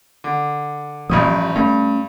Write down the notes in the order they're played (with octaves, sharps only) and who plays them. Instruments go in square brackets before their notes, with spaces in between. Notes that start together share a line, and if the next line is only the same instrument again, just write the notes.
[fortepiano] D3
[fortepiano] A1 G2 D#6 [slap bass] A#2 F3
[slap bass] F3
[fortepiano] G2 [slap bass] A3 C#4